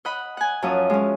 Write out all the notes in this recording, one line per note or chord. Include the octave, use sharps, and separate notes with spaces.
D#5 F#5 B5
F#5 G#5
F#2 F3 C#4 E5 D#6
G#3 C#4